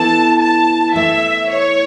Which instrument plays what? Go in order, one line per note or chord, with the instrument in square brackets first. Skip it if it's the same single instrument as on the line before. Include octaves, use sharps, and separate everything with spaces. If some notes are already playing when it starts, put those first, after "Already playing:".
Already playing: [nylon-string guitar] E3 B3 E4 A4 [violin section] A5
[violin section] A5
[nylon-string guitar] E3 A3 E4 [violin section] E5
[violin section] C#5